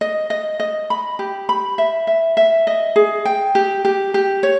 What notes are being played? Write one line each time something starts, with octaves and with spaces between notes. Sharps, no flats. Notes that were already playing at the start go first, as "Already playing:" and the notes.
D#5
D#5
D#5
B5
G4
B5
E5
E5
E5
D#5
G#4
G5
G4
G4
G4
C#5